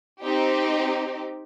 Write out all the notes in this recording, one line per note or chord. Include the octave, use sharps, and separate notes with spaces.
C4 D#4 G4